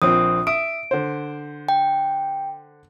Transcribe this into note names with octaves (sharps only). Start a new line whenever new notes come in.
A#1 F3 C4 D#6
E5 D#6 D7
D3 C5
G5